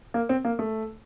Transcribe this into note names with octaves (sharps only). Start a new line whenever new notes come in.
A#3
C4
A#3
A3